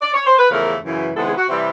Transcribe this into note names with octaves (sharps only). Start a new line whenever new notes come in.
D5
C#5
C5
B4
E2 C#3 F3 A3 A#4
F#2 C#3 E3
C3 D#3 G#3 B3 E4 A4
G#4
F#4
C3 E3 G3